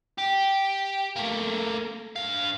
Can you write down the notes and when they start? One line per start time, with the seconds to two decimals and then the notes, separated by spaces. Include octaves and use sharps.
0.18 G4
1.16 A3 A#3
2.16 G2 F5